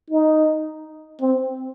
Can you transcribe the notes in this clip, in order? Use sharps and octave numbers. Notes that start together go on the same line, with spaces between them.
D#4
C4